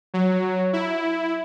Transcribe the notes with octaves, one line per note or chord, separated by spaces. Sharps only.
F#3
E4